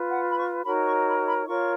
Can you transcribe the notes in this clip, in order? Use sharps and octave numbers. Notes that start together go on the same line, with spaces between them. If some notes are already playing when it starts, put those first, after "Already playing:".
Already playing: F4 B4
F#5
B5
C#6
D#4 F#4 A#4 C#5 B5
C#6
B5
B5
F4 A#4 C#5 C#6